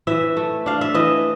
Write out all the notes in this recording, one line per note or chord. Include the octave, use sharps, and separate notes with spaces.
E3 E5
A3
D4 F5
E5
E3 D#5